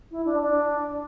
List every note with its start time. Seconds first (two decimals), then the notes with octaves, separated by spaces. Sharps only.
0.11 E4
0.26 D4
0.41 D4